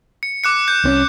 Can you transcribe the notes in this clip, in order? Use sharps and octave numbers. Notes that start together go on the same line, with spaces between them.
C#7
D6 F#6 C#7
G6
C2 C4 C#4